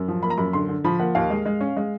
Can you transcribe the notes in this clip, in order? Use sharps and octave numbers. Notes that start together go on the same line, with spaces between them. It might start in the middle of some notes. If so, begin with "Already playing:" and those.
Already playing: F#2
F3
A#3 B5
A#5
F#2 B5
D3 C6
D3
F3 B5
A#3 F#5
D#2 F5
G#3
G#3
C#4
G#3